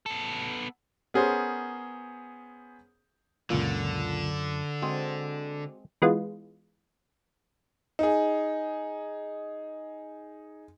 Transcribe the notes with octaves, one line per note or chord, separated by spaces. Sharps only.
B3 A4
B3 C#4 G#4 A#4 C5
C#2 F#2 A#2 D3 F4
G#3 C4 F#4 G#4 C5
E3 G#3 B3 F4
D#4 G#4